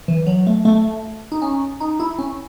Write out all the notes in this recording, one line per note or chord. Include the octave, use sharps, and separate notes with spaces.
E3
F#3
A3
A3
D#4
C#4
D#4
E4
C#4